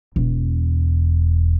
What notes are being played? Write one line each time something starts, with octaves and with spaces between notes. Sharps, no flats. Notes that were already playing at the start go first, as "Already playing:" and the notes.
E1